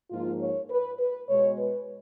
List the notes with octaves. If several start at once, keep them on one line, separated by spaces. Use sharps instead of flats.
G#2 F3 A#3 F4
C#5
B4
B4
B2 G#3 C#5
B4